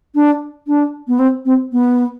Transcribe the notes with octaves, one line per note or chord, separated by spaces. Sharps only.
D4
D4
B3
C4
C4
B3